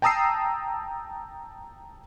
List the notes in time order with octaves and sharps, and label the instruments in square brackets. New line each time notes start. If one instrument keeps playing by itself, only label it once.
[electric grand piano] G5 A5 A#5 D#6 E6 C7